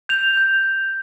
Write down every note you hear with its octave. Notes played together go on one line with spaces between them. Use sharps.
G6 F7
G6